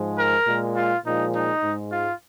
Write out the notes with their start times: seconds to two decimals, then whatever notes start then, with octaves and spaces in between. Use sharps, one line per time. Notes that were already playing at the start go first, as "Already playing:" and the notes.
Already playing: G#2 F3 G#3
0.18 A#4
0.47 A#2 G#3
0.76 F4
1.05 A#2 F3 G#3 D#4
1.34 D#4
1.63 G#2 G#3
1.91 F4